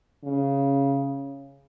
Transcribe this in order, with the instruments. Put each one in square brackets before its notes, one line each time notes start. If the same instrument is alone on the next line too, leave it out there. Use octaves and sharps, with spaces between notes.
[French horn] C#3